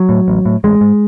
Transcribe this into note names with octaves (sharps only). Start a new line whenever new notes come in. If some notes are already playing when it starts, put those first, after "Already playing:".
Already playing: F#3
A2
A1
A2
A1 G#3
G#2